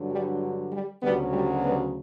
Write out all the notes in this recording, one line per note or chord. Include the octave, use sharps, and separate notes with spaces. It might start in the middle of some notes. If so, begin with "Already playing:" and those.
Already playing: G2 D3 F#3
G3
G3
D2 C#3 F#3 G3 B3
G3
G3 B3